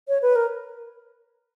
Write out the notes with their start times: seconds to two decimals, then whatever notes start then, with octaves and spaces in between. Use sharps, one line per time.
0.08 C#5
0.22 B4
0.36 A#4